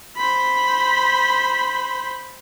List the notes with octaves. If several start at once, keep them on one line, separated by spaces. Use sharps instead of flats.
C5 B5